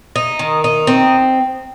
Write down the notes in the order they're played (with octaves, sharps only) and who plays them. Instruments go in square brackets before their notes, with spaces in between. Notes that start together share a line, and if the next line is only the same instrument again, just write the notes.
[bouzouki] D#4
D#3
D#4
C4